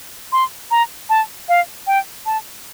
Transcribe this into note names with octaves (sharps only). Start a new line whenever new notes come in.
C6
A#5
A5
F5
G5
A5